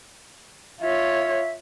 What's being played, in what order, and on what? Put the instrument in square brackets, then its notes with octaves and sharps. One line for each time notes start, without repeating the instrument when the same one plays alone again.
[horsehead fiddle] F4 C#5 [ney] E5